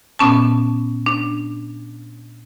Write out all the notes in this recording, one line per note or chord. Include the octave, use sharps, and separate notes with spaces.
A#2 B3 C#4 A5
D4